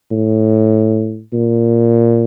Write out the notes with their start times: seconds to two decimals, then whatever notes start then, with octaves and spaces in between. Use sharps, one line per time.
0.11 A2
1.33 A#2